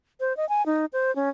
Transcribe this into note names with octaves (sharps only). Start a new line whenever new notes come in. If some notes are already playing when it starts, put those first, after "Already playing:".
C5
D#5
G#5
D#4
C5
C#4